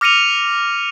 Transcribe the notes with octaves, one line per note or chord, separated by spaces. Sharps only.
D6 F6 A#6 C#7 D#7 F7